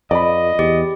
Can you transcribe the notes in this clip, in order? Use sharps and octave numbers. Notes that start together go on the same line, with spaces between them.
F2 D5 D#5 B5
E2 G4